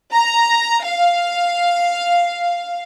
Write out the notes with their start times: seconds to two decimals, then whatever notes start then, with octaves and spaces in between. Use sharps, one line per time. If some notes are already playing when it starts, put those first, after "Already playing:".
0.12 A#5
0.83 F5